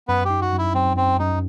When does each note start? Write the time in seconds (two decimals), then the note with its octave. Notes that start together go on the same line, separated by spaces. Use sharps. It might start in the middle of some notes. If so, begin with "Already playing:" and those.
0.08 F#2 B3 B4
0.25 D#4 G4
0.42 F#4
0.53 F#2
0.58 E4
0.74 F#3 C4
0.97 F#2 C4
1.19 F#2 D#4